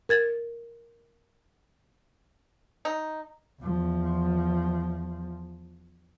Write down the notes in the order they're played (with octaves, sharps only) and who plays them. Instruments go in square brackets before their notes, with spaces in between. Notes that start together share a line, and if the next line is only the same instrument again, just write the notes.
[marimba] A#4 G#6 A6
[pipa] D#4
[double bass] E2 F3